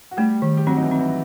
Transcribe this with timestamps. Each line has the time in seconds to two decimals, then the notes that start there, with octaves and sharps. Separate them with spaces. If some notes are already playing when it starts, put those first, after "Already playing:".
0.11 F#4
0.17 G3 A3 G4
0.42 D#3
0.57 G4
0.67 F#3 C4 F#4
0.77 D#4
0.83 E3 E4
0.91 C4 F#4
0.99 E3 E4